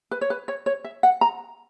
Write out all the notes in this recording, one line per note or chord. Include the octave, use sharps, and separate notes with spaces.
B4
C#5
B4
C#5
C#5
E5
F#5
A#5